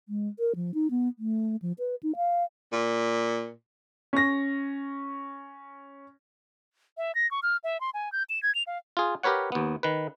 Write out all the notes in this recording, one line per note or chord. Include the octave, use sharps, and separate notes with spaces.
G#3
A#4
F3
D#4
B3
A3
F3
B4
D#4
F5
A#2
C#4 A#6
E5
A#6
C#6
F6
E5
C6
G#5
G6
E7
G#6
F7
F5
F4 G#4
G4 A#4 B4 C#5 F#5
D#2 B3
D#3 B4